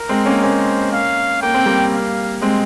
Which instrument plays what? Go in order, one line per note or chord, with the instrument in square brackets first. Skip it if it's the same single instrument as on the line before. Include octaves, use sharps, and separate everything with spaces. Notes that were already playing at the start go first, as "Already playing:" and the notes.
Already playing: [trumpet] A#4
[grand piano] G#3 C4
A#3 C#4
[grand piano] A#3 C#4 [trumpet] C5
[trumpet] F5
[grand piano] A#3 [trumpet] G5
[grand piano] C4
G3 A#3
[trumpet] F5
[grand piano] G#3 C4